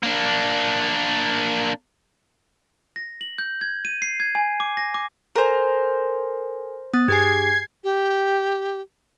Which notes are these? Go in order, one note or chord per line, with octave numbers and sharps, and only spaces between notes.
A#3 D4
A#6
F#7
G6
G#6
D#7
C7
G#6
G#5
D6
A#6
D6
A4 A#4 C5 G#5
B3 D#6 F#6 A6
G2 G4 G#4 G#5 G#6 C7
G4